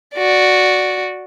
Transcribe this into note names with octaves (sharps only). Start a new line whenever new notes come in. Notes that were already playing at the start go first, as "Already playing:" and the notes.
F#4 D5